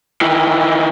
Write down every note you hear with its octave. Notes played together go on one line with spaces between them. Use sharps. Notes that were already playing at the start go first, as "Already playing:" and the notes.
D#3 E3